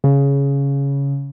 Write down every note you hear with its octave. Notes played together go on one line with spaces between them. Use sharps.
C#3